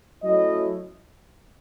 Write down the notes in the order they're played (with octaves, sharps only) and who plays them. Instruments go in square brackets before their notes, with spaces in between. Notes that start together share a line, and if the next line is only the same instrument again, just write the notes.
[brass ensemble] F#3 A3 C#4 E4 D#5